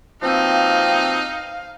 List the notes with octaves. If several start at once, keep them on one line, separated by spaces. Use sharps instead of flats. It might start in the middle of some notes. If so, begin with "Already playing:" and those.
B2 F3 A#3 C4 D#4 F5